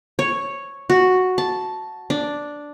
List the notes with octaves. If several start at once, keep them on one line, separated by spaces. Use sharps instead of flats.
C#5
F#4
A5
D4